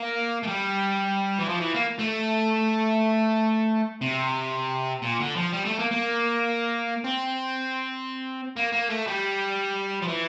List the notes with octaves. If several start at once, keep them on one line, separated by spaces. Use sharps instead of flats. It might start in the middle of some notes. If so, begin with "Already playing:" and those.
Already playing: A#3
A3
G3
E3
F3
E3
A#3
A3
C3
A#2
D3
F3
G3
A3
A#3
A#3
C4
A#3
A#3
A3
G3
F3
E3